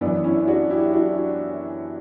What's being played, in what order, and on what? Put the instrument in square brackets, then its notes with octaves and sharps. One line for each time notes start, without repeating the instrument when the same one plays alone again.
[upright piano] F#2 B3 D4
E3
C#4 E4
D4 F#4
E4 G4
D4 F#4